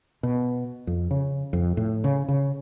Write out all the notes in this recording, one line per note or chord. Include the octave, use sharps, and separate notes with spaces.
B2
F2
C#3
F2
A2
C#3
C#3